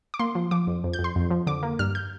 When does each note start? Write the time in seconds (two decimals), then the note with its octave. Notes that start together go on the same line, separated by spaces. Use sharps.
0.14 D6
0.19 A#3 C6
0.35 F3
0.51 F3 D6
0.67 F2
0.84 F2
0.93 G6
0.99 F2
1.04 C6
1.16 F2
1.31 F3
1.47 D3 D6
1.63 A#3
1.79 G2 F6
1.95 G6